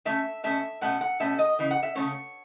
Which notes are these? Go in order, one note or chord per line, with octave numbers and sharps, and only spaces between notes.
B2 A3 C#4 E5
B2 A3 C#4 E5
B2 A3 C#4 F#5
F#5
B2 A3 C#4 E5
D#5
C#3 E3
F#5
E5
C#3 E3 A3 C#4 C#5